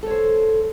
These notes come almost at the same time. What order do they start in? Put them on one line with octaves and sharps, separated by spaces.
A4 C#5 C5